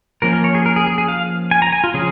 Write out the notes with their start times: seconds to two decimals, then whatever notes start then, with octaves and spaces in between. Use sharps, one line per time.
0.22 F3 A#3 C#4 A#4
0.33 A#4
0.44 C#5
0.55 G#4
0.66 A#4
0.76 G#4
0.87 G#4
0.98 G#4
1.08 F5
1.51 G#5
1.62 A#5
1.73 G#5
1.84 F4
1.94 C#3 F3 C#4 G#4